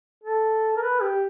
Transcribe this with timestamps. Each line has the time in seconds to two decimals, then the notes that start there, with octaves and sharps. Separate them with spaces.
0.24 A4
0.77 A#4
0.82 B4
1.01 G4